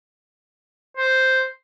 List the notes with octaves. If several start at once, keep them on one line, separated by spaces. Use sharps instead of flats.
C5